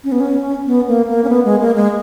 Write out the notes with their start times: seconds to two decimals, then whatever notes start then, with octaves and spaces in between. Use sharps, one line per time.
0.04 C#4
0.12 B3
0.20 C#4
0.66 B3
0.88 A#3
1.08 A#3
1.24 C#4
1.29 B3
1.45 G#3
1.60 A#3
1.76 G#3